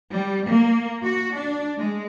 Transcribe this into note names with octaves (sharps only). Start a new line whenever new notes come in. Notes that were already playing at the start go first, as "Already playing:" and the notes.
G3
A#3
F#4
D4
G#3